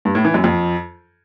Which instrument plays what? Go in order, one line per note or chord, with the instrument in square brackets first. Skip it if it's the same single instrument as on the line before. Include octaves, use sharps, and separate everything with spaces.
[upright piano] G2
A2
E3
F#2
F2